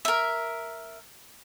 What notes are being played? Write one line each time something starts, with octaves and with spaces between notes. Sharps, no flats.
A#4 E5